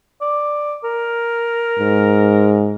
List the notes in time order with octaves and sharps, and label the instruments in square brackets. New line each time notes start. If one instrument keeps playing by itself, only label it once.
[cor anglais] D5
A#4
[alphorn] G#2